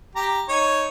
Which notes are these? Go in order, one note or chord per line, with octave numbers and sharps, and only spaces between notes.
G4 A#5
D#4 C#5